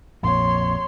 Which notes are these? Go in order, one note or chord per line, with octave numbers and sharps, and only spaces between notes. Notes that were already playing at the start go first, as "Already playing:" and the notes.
A#1 F2 A#2 C#5 C6